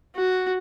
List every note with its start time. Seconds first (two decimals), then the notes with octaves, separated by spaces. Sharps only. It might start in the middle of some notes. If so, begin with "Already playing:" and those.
0.16 F#4